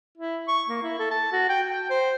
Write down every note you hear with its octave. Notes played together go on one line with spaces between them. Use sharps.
E4
C#6
A#3
E4
A4
A5
F#4
G5
G5
C5